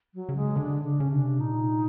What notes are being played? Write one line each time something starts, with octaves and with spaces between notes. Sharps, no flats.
F#3
C#3
G#3
D3 D4
C#3 D4
C#3 C#4
C3 D4
A#2 D#4